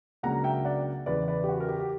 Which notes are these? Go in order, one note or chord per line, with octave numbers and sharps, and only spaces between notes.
C#2 C#3 F#3 A#3 D4 F#5 A#5
E5 G5
D5 F#5
E2 C#3 E3 B4 D5
B4 D5
G4
F#4
A#4
G4
G4